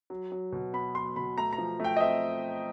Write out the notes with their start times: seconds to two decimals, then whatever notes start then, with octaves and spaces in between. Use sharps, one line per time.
0.10 F#3
0.32 F#3
0.52 B2
0.73 B3 B5
0.95 F#3 C6
1.16 B2 B5
1.38 A3 A#5
1.53 A#5
1.58 F3
1.80 A3 G5
1.97 D#5
2.00 C4 E5